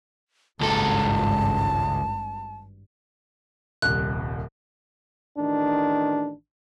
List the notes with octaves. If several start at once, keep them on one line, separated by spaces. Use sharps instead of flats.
G#1 C#2 G2 A4 A5
D#1 C2 F#6
A1 D#3 D4